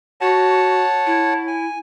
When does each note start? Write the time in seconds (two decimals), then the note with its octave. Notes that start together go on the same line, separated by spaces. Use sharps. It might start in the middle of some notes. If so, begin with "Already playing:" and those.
0.21 F#4 C#5 F#5 A5
1.06 E4
1.47 G#5